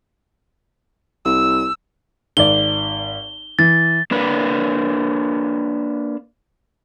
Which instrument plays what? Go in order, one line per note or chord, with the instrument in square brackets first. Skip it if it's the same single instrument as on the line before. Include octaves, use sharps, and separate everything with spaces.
[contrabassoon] C2 [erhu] E6
[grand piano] G#1 D5 [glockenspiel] G7
[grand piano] E3 [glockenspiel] A6
[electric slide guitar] A#3 D4 B4